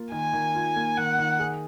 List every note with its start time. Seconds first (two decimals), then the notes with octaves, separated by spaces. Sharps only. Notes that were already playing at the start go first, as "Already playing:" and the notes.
Already playing: A#3 F4
0.12 D#3 G#5
0.33 D#3
0.55 F4
0.76 A#3
0.97 D#3 F#5
1.18 D#3
1.40 G#4